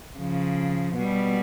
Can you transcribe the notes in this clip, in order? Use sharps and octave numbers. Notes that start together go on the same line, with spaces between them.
C#3 F3
B2 G3